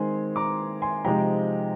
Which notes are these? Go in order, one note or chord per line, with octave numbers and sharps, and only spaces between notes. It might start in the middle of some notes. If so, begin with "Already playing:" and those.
Already playing: D#3 G#3 C4 G#5 C6
A#5 D6
G#5 C6
C3 F3 G#3 D#4 G5 A#5